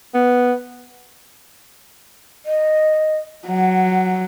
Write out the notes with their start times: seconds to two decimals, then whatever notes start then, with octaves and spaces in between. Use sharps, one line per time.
0.14 B3
2.46 D#5
3.48 F#3 F#5